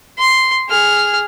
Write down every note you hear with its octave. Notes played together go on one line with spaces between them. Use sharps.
C6
G#4 F6